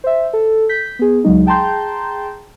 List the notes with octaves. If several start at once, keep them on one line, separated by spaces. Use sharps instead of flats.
C5 E5
A4
G6 B6
B3 G#4
C#2 F#3 G#3 D#4
G#4 G5 A5 A#5 C6 G6